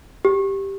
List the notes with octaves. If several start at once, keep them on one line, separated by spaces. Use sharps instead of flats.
G4